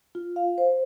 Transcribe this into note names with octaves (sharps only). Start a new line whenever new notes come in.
F4
F5
C5